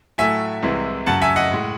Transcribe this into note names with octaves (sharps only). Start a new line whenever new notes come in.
A2 F#3 A3 E5 G#5
C2 C3 E3 G#3
F#2 C#3 F#3 F#5 A5
E5 G#5
D#5 F#5
A2 G#3